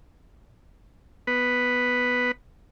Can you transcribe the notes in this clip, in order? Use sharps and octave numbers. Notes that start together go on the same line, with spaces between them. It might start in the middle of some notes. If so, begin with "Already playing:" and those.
B3 B4